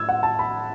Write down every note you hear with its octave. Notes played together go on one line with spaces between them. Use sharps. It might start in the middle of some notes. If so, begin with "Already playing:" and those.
Already playing: A2 E6 G#6
F#5
A5
B5